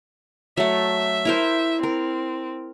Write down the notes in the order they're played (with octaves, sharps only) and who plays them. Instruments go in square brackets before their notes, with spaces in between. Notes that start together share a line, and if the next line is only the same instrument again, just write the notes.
[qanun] F#3 A3 [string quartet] E5
[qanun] E4 A#4 C5
[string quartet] C4 [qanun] A#4